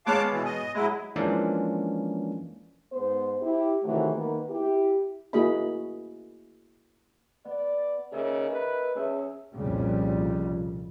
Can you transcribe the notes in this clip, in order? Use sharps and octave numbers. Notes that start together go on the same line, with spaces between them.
G#3 B3 C#5 F5 A5 D6
B2 E3
D#5
F#3 G#3 E4
E3 F3 G#3 A#3 C#4 D4
G#2 B3 C5
E4 G4
C3 D#3 E3 F#3 A3
D#3 A#3 B3
E4 G4
A#3 E4 F#4 G#4 D#5 B5
B3 D5
C#3 A#4 D#5 E5
B4
C#4 G#4 E5
C2 F2 A#2 C#3 G3